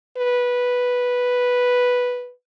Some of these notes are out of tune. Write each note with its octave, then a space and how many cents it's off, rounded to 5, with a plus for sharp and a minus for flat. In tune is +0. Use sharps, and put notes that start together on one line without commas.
B4 -5